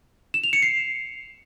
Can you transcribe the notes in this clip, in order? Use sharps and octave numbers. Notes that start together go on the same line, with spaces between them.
E7
F7
C#7
C7